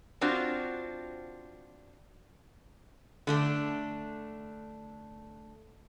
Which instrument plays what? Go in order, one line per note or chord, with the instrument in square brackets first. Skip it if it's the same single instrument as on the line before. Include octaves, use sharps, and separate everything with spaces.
[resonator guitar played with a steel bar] C4 D4 F4 F#4 C5
D3 A3 D4